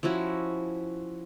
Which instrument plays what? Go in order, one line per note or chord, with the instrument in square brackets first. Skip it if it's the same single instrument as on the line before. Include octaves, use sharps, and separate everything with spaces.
[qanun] F3 C#4 E4 F#4